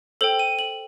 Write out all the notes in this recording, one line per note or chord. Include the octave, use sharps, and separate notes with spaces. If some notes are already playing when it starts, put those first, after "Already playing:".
A4 C5 G5 F#7
D#7
F#7